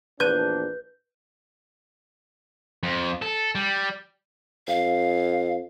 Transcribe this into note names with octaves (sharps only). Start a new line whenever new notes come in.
A#1 E2 D4 B4 G6 D#7
F2
A4
G3
F2 F5